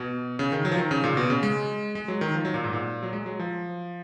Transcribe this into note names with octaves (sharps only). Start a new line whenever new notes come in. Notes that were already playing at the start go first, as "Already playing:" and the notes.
Already playing: B2
C#3
D#3
F#3
F3
D#3
C#3
A#2
B2
C#3
G#3
G#3
F#3
D#3
F3
F#3
A#2
G#2
A#2
F#3
G#3
F#3
F3